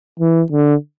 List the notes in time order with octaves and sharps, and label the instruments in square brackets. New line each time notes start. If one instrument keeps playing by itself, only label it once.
[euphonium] E3
D3